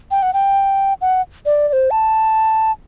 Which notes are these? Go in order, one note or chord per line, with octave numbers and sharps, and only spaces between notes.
G5
F#5
G5
F#5
D5
D5
C5
A5